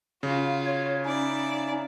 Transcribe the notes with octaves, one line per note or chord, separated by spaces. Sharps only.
C#3 F4 F#4
C#5
C#4 D#4 E4 D5